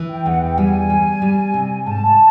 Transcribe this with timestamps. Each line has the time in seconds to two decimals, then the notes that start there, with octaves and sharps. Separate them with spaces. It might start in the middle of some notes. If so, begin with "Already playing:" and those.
Already playing: E3
0.09 G5
0.26 E2 F#5
0.42 G5
0.57 G3 G#5
0.90 G3
1.22 G3
1.54 C3
1.85 G#2 A5